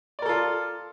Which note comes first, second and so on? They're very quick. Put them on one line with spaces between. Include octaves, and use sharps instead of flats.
D5 A#4 A4 F4